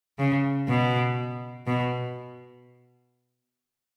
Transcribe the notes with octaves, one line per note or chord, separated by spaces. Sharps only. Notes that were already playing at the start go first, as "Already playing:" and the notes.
C#3
B2
B2